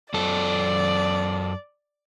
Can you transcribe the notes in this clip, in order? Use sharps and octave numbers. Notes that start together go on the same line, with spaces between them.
F#2 A4 D5